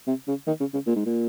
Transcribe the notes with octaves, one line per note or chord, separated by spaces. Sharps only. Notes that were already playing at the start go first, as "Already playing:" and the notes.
C3
C#3
D#3
C#3
C#3
A#2
G#2
A#2